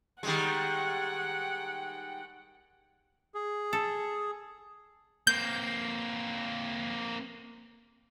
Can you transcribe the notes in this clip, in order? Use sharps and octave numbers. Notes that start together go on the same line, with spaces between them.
D#3 G3 G#3 F#5 G5
G#4
A4
A#3 C4 G6